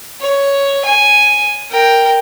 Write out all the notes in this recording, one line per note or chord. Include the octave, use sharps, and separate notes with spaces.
C#5
G#5
A#4 G5